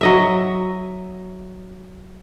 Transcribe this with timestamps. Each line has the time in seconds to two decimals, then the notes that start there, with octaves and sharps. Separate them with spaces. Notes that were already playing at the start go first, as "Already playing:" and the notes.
0.01 F#3 D#5 E5